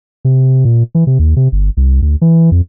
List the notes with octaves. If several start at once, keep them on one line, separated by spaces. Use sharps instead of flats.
C3
A#2
E3
C3
D#2
C3
G1
C2
D2
E3
F2